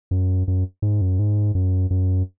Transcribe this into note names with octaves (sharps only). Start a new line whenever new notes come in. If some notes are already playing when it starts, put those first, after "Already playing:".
F#2
F#2
G#2
F#2
G#2
F#2
F#2